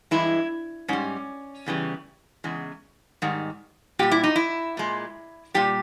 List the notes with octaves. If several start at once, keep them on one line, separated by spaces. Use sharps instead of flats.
G2 E3 G#3 E4
G#2 G3 C#4
E2 C#3 E3 G3
E2 C#3 G#3
G#2 D#3 G3
A#2 G3 G4
E4
D#4
E4
A#2 G#3
A#2 G3 G4